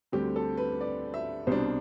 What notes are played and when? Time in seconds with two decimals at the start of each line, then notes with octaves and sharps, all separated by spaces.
0.12 D2 D3 G3 C4 G4
0.36 A4
0.58 B4
0.81 D5
1.14 E5
1.47 C2 B2 G3 D4 C5